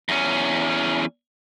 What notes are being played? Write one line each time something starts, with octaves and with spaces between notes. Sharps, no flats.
E2 C#4